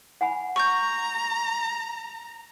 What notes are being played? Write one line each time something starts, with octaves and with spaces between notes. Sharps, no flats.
F#5 G#5 B5
A#5 C#6 G6